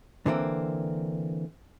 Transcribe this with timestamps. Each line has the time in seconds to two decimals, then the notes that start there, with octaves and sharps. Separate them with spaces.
0.26 D3 E3 A#3 C4